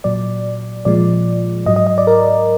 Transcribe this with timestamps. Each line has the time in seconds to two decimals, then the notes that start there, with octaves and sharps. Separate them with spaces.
0.04 A#2 F#3 D5
0.85 A#2 F3 G#3 D5
1.66 G#2 F#3 D#5
1.76 D#5
1.87 D#5
1.98 D5
2.07 A#4